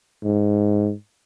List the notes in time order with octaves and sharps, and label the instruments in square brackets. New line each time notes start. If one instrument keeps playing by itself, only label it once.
[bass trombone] G#2